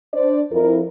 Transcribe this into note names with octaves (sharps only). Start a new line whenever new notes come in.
D4 C5 D5
F2 E4 A#4